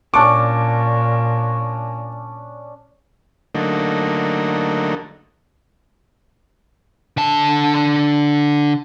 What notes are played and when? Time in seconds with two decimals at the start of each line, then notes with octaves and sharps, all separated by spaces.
0.14 A#2 C#4 D4 C#6 D6
3.55 D3 F#3 A3 A#3 D#4
7.17 D3 A5